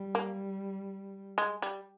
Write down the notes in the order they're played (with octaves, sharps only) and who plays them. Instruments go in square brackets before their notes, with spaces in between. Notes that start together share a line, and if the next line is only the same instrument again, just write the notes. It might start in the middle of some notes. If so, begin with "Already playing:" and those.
Already playing: [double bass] G3
[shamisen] A#3
G#3
G3